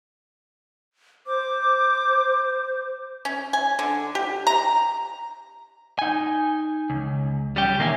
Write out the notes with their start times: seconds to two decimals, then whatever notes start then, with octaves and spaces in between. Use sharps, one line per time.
1.27 C5 D6
3.25 C#4
3.53 G#5
3.79 D3
4.15 G4
4.47 A#5
5.99 D#4 G#5
6.90 C#2
7.56 G3 C#4 G4
7.78 B1 D#3 A#3 A4 E5 G#5